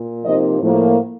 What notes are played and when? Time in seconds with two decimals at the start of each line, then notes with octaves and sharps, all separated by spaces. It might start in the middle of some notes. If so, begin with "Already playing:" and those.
Already playing: A#2
0.25 C3 F3 A#3 D#4 D#5
0.61 A2 F3 A#3